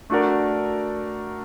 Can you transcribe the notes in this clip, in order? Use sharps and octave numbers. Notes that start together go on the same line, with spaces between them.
A3 D4 F#4 A#4 D5